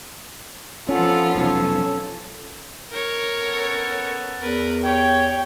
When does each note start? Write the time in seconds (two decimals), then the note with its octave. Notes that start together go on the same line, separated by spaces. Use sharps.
0.89 F3 B3 C#4 F4 A4 F#5
1.35 F1 B1 C#4 A4
2.91 A#4 C#5
3.40 B3 C#4 A4
4.40 E2 A#4 B4
4.84 G4 C#5 G5